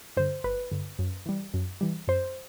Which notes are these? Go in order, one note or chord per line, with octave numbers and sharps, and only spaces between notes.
G2 D3 C5
G1 B4
G2 D3
F#2
E3 G3
F#2
E3 G3
F#2 C5